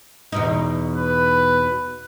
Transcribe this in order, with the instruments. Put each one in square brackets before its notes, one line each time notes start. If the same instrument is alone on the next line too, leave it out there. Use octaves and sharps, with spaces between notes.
[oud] E2 B2 D#4
[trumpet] B4